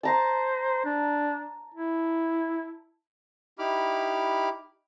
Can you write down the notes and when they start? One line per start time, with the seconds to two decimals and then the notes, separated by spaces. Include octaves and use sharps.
0.03 C5 A5 A#5
0.85 D4
1.74 E4
3.59 D#4 E4 G4 B5 D6 F6